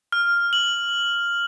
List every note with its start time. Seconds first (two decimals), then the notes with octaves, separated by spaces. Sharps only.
0.12 F6
0.53 F#7